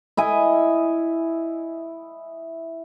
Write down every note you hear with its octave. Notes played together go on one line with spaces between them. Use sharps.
E4 D#5 G#5